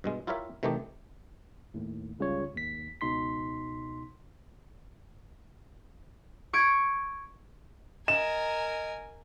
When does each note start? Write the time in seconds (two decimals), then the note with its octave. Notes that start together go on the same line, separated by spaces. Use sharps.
0.04 G2 B2 G#3
0.27 E4 F4 G4 A#4 C#5 E5
0.63 C3 D#3 E3 A3 D#4 G4
1.74 D#2 A2
2.19 G1 C#2 C#3 G3 F4 C#5
2.53 G#1 D#2 B6
3.01 C#2 B2 D#4 C6 B6
6.53 C#6 G#6 D7
8.08 A#4 D#5 G#5 E7